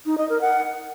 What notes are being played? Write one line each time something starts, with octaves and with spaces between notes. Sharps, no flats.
D#4
D#5
A#4
F#5